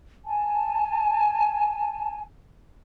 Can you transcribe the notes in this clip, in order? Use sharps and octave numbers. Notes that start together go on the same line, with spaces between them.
G#5 A5